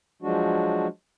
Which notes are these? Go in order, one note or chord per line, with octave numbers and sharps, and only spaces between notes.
F3 F#3 G#3 D4 F#4